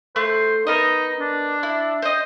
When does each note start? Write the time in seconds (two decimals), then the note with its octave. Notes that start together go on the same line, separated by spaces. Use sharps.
0.16 A3 C5
0.67 B3 D#4 A#4 D#5
1.19 D4
1.63 E4
2.02 C5 D#5